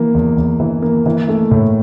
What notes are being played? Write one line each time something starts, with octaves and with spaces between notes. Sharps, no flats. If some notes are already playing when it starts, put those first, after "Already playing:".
Already playing: E3 A#3
E2
E2
E3
A#3
E3
A3
A2